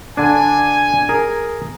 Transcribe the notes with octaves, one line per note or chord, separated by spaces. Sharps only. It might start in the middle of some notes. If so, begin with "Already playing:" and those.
D3 D4 G#5
G#4 A#4